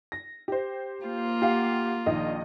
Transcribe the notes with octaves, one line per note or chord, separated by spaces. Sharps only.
A#6
G4 C5
A#3 F4
G4 F5 F#5
A#1 D#3 D#5